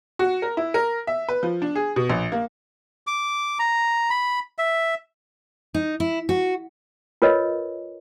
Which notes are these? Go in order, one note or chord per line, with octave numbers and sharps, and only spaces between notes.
F#4
A#4
E4
A#4
E5
B4
F3
D4
G#4
B2
A#1
A#3
D6
A#5
B5
E5
D#4
E4
F#4
F4 A#4 B4 C#5 D#5